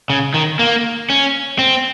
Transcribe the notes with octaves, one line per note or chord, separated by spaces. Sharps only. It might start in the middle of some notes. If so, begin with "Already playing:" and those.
C#3
D#3
A#3
C#4
C4